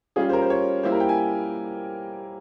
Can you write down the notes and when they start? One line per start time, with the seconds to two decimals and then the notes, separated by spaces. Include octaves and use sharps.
0.16 G3 C#4 F4 G#4
0.29 C5
0.33 A#4
0.42 C5
0.50 C#5
0.83 G3 A#3 E4 C5
0.92 A#4
1.00 G5
1.09 G#5